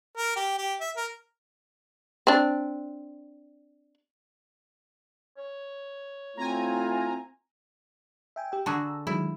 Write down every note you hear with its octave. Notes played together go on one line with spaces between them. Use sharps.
A#4
G4
G4
E5
A#4
C4 D4
C#5
A3 C4 E4 F4 G#5 A#5
E5 G5 G#5
G4 E5 G5
D3 F#4 G#4 A5 A#5 E6
D#3 F#3 G#3 E4